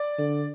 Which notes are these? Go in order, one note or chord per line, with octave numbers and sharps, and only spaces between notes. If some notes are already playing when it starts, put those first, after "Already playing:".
Already playing: D5
D3